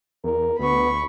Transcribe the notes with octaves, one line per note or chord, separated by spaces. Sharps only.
E2 A#4
D2 B3 B5 C#6